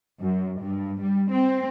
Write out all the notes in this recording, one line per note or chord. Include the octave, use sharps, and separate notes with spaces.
F#2
G2
G3
C4